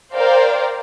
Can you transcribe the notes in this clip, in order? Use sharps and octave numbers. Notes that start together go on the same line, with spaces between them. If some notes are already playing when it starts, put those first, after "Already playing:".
A#4 C5 D5 F5 G5